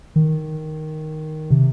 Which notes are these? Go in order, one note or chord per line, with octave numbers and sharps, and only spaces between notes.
D#3
C3